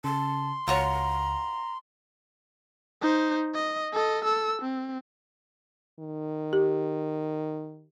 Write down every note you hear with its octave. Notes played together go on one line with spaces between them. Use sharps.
C#3 A5 C6
C#2 F4 F#4 C#5 A#5
D#4 C5
D#5
A4 D#5
A4 E6
C4
D#3
G4